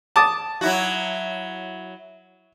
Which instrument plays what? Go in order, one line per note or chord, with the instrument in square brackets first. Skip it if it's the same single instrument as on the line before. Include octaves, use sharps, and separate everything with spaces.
[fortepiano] A5 D6 D#6
[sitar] F#3 E4 F#4